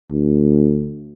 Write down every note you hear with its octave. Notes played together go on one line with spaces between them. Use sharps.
D2